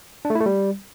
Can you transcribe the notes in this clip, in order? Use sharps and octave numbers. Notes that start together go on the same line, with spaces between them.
D4
A3
E4
A3
G3